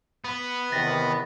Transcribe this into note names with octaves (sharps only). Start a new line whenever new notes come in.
B3 B5
E2 C3 D#3 A6 A#6